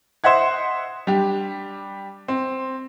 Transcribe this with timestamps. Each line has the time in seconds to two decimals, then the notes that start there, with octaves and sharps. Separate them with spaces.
0.24 C5 D#5 E5 F#5 G#6
1.07 G3 D4 G4
2.28 C4